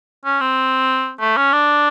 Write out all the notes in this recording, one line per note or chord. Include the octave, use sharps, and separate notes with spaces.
C#4
C4
A3
C#4
D4